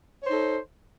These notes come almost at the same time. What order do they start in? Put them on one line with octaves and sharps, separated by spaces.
C#5 C5 D#4 A4